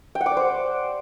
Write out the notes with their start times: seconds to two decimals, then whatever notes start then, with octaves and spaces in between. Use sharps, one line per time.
0.15 G5
0.21 F#5
0.26 D6
0.31 D5
0.37 C5